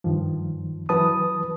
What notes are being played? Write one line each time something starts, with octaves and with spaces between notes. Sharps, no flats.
G2 D#3 F3
E3 F#3 B4 A5 D#6